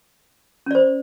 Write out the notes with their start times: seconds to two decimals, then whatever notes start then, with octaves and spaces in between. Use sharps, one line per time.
0.66 C#4
0.71 D5
0.75 C5